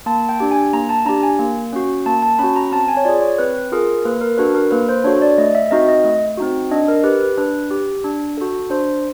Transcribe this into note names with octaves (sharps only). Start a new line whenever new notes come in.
A#3 A5
G5
D4 G4
G#5
A#3 A#5
A5
D4 G4 A#5
G#5
A#3
C#4 F#4
A#3 A5
A5
C#4 F#4 B5
A#5
C4 A5
G#5
C#5
F4 G#4 D5
C#5
C4 B4
F4 G#4 A#4
A#3 B4
A#4
D4 F#4 A4 B4
A#4
A#3 B4
C5
D4 F#4 A4 C#5
D5
A3 D#5
E5
C4 D#4 F#4 D#5
D#5
A3
C4 D#4 F#4
D4 D#5
A#4
G4 B4
B4
D4 B4
G4
D4
F#4 A4
D4 C5